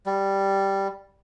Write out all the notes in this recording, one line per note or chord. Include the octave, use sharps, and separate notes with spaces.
G3